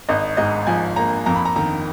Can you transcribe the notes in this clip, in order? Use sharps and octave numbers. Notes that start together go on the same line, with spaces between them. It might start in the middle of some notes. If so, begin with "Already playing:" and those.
G#1 D#5
G#2 D#5
F3 G#5
A#3 A#5
F2 A#5
B5
A#5
D#3 A#5